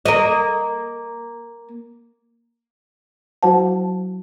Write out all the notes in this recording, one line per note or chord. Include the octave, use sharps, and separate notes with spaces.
A#3 D#5
F#3 E4 F#4 C5 F#5 A5